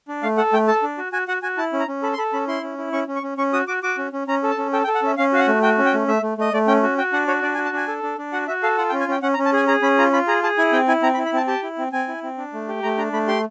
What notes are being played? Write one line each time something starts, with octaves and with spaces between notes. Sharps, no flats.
D4
A3 F5
A4 F#5
A3 G5
A4 A5
D4
F#4
F#4 G#5
F#4 F#5
F#4 G#5
E4 A5
C#4
A#5
C#4
A4 B5
C6
A4 B5
C#4 B5
E4 C6
C#4
E4
C#4 C#6
C#4
C#6
C#4
C#4 C#6
F#4 D#6
F#4 D6
F#4 D6
C#4
C#4
C#4 A#5
A4
A5
C#4
A4 G5
G5
A4
F#5
C#4 E5
C#4 F5
F#4 F5
F#5
A3
F#4 G5
C#4
G5
A3
A3 E5
A3
A3 D#5
A3 D5
C#4 G5
F#4
F#4 G5
D4 F#5
F#4 C#5
D4 D5
G#5
F#4
A5
D4 G#5
A4
D4
D4
F#4 F#5
F#4 E5
A4 F5
F4 F#5
G5
C#4
G#5
C#4 G5
C#4 F#5
A#5
C#4
A5
G#4 G#5
G#4 A#5
C#4 B5
F4 A#5
F4 B5
G#4 A#5
G#4 A5
E4 G#5
C4 G5
E4 G#5
C4 A#5
B5
E4
B5
C4 A5
G4 A5
E4
C4
C4 G#5
E4
C4
D4
A3
G4
A3 A#5
D4 A#5
A3 B5
G4 C6